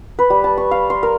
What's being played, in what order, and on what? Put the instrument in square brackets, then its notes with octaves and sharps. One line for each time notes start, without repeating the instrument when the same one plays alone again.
[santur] B4
G3
A5
C#6
F5
C6
A#4